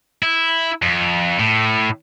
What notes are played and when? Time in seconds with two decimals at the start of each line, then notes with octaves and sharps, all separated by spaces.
0.23 E4
0.82 F2
1.39 A2